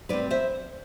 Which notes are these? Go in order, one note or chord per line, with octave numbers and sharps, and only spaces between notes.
A2 G3 C4 B4 D5
C5 E5